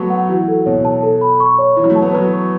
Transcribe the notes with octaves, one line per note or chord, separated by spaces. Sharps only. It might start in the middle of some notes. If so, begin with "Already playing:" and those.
Already playing: F#3 A3 B3 A5 C#6
F#5
E3 F#4
A4
B2 C#5
A5
A4
B5
C#6
C#5
E3 E4
F#3
A3
A5
B3
F#3 B4
C#6